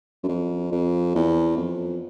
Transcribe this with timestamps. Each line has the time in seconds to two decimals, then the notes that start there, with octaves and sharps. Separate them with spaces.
0.23 F#2
0.29 F2
0.72 F2
1.15 E2
1.58 F2